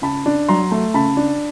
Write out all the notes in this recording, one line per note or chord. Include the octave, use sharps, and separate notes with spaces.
C#3 A5 B5
D4
F#3 A#5 C6
A3
C#3 A5 B5
D4